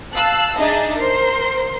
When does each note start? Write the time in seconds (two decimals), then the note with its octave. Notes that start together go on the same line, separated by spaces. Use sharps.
0.13 F5 A5 E6 F#6
0.56 D4 D#4 G#4 D#5 E5 A5
0.97 A#4 C5 C6